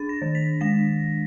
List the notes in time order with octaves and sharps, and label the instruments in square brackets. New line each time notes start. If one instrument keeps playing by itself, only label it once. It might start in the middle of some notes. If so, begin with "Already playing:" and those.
Already playing: [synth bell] D4 A6
A#6
D#3
B6
G#3 A#6